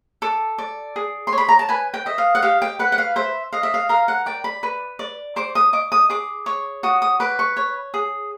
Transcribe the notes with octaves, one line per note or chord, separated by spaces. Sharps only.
A4 D6
D5
G#4
C6
C#5
B5
A#5
A5
B4 G#5
G5
D#5 E5
F5
F#5
G4 F5
G5
B4 F#5
F#5
F5
C5 E5
D#5 F5
E5
F5
A#4 F5
F#5
D5 G5
B5
B4
D5
C5 D6
D#6
D#5 D6
D#6
G#4 D6
C#5
F#4 D#6
D#6
B4 D6
C#6
C#5
G#4